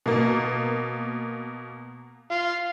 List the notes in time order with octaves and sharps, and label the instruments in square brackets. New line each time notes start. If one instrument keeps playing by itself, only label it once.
[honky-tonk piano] B2 A#3
[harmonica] F4